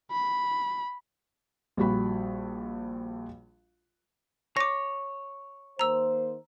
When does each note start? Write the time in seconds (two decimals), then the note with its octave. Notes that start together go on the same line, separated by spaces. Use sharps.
0.12 B5
1.77 A#1 G3 F#4 B5
4.57 C#5 D6 A#6
5.79 D#3 A#3 C5 A#5 E6